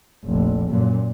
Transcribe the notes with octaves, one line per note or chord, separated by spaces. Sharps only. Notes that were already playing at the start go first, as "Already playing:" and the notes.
F1 A#1
F#2 A#2